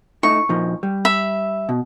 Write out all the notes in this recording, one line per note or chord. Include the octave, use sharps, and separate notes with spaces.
A3 D#4 E4 C#6
A#2 F3 D#4
G3
E5 B5
B2